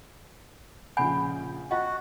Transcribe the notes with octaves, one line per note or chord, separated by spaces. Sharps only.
A#1 C#3 F#5 G#5 B5 G6
F4 F#4 D#5 F#5